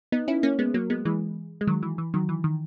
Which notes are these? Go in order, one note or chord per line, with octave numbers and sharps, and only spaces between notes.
B3 D#4
C#4 E4
A#3 C#4
G#3 B3
F#3 A#3
G#3 B3
E3 G#3
G#3
D#3 F#3
E3
E3
D#3 F#3
E3
D#3